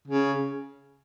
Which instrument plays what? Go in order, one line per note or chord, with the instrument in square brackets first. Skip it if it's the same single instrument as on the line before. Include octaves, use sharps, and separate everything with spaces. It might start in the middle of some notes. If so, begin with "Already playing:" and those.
[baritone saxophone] C#3